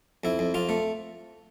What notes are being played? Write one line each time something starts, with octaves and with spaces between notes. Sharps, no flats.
F2 E4
F2
F2 F4
A3